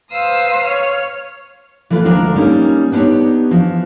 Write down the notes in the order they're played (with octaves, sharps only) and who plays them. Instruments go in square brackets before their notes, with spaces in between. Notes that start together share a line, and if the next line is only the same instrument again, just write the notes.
[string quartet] B4 C5 F5 A#5 D#6 E6
C#5 F6
[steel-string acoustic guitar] E3 A3 F4 B4
D2 F3 G#3 D4 A#4
G3 A#3 C#4 D#4
B3 D4 D#4 G4 C#5
E3 F3